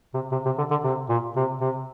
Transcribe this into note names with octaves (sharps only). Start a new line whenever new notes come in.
C3
C3
C3
D3
D3
C3
A#2
C3
C3